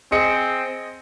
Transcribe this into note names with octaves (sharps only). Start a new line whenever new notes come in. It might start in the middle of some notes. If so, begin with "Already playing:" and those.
C4 G#4 D#5 C#7